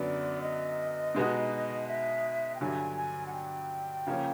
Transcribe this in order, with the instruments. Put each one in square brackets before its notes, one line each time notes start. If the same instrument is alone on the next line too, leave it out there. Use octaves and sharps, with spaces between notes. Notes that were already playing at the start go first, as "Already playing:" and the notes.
Already playing: [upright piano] F#2 D3 F#3 B3 [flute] D5
[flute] D#5
[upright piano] B2 G#3 B3 D#4 F#4
[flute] E5
G5
[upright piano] G2 D3 F#3 [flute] G#5
[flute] G#5
F#5
G5
[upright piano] C#3 F3 A#3 C#4